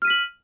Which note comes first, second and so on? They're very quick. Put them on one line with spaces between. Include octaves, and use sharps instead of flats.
F6 D#7 B6 F#7